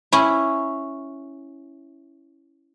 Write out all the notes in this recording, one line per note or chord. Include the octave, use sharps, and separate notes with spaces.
C#4 E4